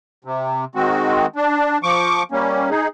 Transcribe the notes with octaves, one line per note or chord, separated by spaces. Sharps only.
C3
D#3 G#3 C4 F#4
D4
F3 C#6 D6
G3 A#3 C#4
D#4 G#4